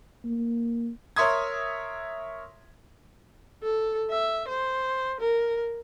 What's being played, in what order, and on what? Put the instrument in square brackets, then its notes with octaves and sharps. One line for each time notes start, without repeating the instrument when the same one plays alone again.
[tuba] A#3
[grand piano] A#4 C#5 E5 C6 D#6 G#6
[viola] A4
E5
C5
A#4